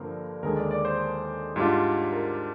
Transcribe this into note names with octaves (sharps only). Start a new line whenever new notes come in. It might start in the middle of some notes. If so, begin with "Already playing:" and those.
Already playing: G2 D3 F3 A#3 A#4 C5
D#2 D3 G#3 A#4
D5
D5
C5
G#2 G3 D4 F4
A#4